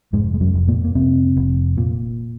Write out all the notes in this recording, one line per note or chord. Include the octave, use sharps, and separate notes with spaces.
F1 G#2 G#3
G#3
F#2 F#3
F1
A#2 A#3
A#3
F1 C3 C4
F1
A#2